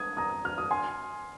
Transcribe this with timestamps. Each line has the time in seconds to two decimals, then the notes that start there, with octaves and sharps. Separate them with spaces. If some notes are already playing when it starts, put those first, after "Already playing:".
Already playing: D#6 G#6
0.17 A#5 D#6
0.45 F6
0.58 D#6
0.71 G#5 C6